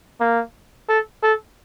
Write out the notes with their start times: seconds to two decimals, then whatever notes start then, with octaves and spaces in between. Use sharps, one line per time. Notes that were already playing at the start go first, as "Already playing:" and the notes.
0.20 A#3
0.89 A4
1.23 A4